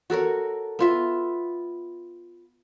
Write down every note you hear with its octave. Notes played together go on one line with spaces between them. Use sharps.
F#4 A4 A#4 C#5
B3 F4 E5